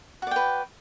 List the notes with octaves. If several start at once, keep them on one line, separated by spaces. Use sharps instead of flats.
F#4 B4 D5 G5